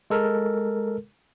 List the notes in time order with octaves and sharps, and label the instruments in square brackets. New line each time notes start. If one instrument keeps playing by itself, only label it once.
[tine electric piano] G#3 A4 A#4